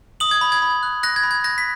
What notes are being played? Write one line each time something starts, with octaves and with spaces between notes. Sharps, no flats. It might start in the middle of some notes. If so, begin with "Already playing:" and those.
D#6 F#7
G#6
B5
G#6
B5
F#6
F#6 A#6
G#6
B5
G#6
F#6 A#6
B6